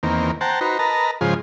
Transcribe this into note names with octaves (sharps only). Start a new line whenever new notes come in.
E2 D#3 A#3 C4
C5 F#5 G5 A5 A#5
D#4 F#4 B4 C5 A#5
A#4 B4 D#5 A5 A#5
G#2 C#3 F3 F4 G#4 C5